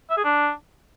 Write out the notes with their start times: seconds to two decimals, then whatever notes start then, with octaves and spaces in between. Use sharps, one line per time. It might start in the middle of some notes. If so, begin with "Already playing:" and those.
0.10 E5
0.17 G#4
0.24 D4